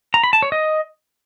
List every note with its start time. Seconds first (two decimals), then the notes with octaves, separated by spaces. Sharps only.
0.14 A#5
0.24 B5
0.33 A5
0.42 C#5
0.52 D#5